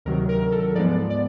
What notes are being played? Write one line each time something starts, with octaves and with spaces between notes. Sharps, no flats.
D2 C3 D#3 F#3 A#4
A#4
A4
G#2 F3 G#3 B3 D5
D5